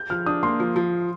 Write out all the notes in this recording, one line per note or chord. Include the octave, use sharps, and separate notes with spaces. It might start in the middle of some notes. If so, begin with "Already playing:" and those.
Already playing: G6
F3 F6
D4 D#6
A#3 C6
F3
F3